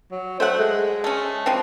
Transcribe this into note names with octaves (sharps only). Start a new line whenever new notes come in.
F#3
A3 C5 F#5
G#3
A3 C#4
E3 F3 C4